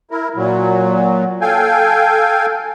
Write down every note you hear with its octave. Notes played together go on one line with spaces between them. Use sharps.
E4 A#4
A#2 F#3
A4 F5 G5 G#5